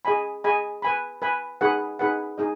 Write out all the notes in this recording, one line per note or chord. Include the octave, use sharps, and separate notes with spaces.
G#4 D#5 G#5 B5
G#4 D#5 G#5 B5
B4 G#5 B5
B4 G#5 B5
D#4 G#4 B4 F#5
D#4 G#4 B4 F#5
D#4 G#4 D#5